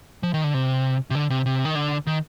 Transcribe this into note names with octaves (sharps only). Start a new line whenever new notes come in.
F3
D#3
D3
C3
C3
D3
C3
C3
D#3
D3
D#3